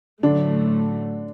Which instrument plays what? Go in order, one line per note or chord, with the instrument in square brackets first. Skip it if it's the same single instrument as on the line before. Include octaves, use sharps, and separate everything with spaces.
[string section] A2 F#3 A3 [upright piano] D3 D4